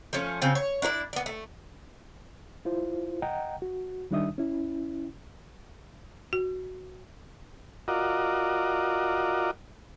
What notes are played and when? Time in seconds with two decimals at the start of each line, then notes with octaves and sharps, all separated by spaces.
0.13 F3 A3 C#4
0.41 C#3 C4 F4
0.55 C#5
0.82 D4 E4 A#4 D5
1.13 B3 D5
1.26 A3
2.65 E4 F4 C5
3.22 D#5 F#5 G5 A#5
3.62 F#4
4.11 D#3 G3 D4 D#4 E5 D#6
4.38 C#4 E4
6.33 F#4
7.88 F4 F#4 A#4 D5 D#5